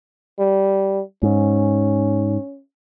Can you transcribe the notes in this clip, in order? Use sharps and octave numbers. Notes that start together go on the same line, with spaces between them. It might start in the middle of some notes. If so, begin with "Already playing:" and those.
G3
G#2 C#4